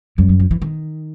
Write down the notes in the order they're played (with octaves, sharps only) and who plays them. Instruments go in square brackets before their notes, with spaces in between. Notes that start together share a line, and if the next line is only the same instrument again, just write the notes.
[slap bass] F#2 [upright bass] G3
[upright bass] F#3
F3
E3
D#3